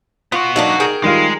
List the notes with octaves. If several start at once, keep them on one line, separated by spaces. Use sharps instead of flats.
B3 F4 F#4
F#3 A#3 D4 D#4
G#4 A#4 G5
D#3 G3 G#3 F4